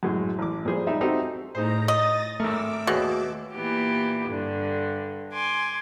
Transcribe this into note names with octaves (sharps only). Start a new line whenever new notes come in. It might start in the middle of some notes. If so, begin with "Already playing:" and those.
F#2 A2 G#3
A1 D6
A#2 F3 G3 G#4 C5
G3 D#4 D5 E5
C4 D#4 F#4 G4 A4
A2 D#4 G#4 C5 A#5
D#5 D#6 A6 A#6
G#1 A3 A4 A#4 D6 E6
D#2 B2 G#4 C#5
A#2 E3 B3 G4
G2 D3
G#5 C6 D6